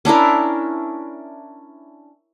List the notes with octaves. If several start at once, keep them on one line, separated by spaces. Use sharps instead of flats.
C#4 D4 E4 A#4